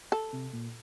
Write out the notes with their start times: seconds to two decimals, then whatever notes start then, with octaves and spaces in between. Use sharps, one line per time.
0.12 A4
0.32 C3
0.53 A#2